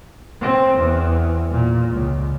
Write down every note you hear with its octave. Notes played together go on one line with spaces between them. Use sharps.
C4
E2
A#2
C#2